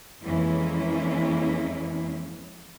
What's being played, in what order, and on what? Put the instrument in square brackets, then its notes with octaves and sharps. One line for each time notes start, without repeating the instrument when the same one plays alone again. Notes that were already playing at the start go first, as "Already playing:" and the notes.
[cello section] F2 E3 G#3 A#3 C#4 E4